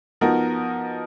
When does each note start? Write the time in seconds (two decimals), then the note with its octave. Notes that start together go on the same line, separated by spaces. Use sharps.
0.21 F3 B3 D#4 F#4 A#4